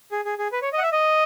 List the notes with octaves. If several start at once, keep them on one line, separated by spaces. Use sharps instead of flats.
G#4
G#4
G#4
B4
C#5
D#5
F#5
E5
D#5